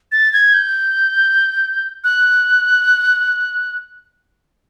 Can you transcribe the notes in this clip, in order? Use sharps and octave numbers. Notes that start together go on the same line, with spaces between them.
A6
G#6
G6
F#6